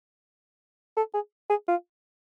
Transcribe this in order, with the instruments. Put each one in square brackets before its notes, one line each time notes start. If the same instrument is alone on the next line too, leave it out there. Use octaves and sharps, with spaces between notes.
[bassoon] A4
G#4
G#4
F4